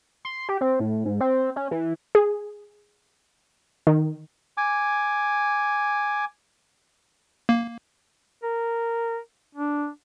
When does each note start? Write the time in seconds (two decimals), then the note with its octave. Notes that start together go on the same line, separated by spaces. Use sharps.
0.25 C6
0.49 G4
0.61 C4
0.80 A2
1.05 G#2
1.21 C4
1.56 C#4
1.71 E3
2.15 G#4
3.87 D#3
4.57 G#5 D6
7.49 A#3
8.43 A#4
9.55 D4